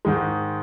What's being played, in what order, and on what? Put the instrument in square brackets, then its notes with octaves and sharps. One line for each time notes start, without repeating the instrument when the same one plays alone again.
[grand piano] G#2 D#3 G#3